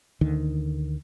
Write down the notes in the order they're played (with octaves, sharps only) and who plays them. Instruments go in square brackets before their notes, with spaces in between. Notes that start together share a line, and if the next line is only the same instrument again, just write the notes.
[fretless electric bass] D2 D3 D#3